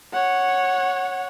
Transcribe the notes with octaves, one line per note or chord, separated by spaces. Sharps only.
C#5 F#5